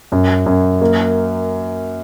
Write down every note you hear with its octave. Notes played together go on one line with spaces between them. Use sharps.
F#2
F#2
A#3